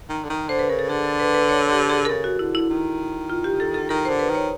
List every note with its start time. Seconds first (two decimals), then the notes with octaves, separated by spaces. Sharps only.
0.10 D#3
0.25 D3
0.30 D#3
0.49 D3 C5
0.59 B4
0.69 C#3 A#4
0.79 A4
0.89 D3 G#4
1.04 A4
1.20 B4
1.34 B4
1.49 C#5
1.70 G4
1.90 G#4
2.05 A#4
2.09 C#3 A4
2.24 F#4
2.39 D3 E4
2.55 E4
2.70 D#3
3.30 F4
3.44 G4
3.60 A4
3.74 A4
3.89 D#3 A#4
4.05 C5
4.10 D3
4.19 B4
4.30 D#3 C#5